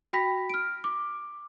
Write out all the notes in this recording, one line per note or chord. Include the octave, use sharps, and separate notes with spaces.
F#4 G5 B5 A#6 B6
F6 D7
D6